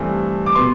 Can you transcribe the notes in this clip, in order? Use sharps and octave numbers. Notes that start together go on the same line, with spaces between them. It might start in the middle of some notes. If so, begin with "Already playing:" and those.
Already playing: G2 E3 A3 C4
D6
B2 B3 C6